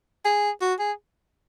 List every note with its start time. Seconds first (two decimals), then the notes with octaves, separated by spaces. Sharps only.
0.25 G#4
0.61 F#4
0.79 G#4